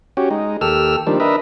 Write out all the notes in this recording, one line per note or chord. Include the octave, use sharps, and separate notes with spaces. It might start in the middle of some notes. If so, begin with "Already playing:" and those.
C#4 F#4 G4
G#3 D#4
D#2 G4 A4 E6 F6
D#3 F3 G3 A#3 D4
D4 A#4 B4 D#5 E5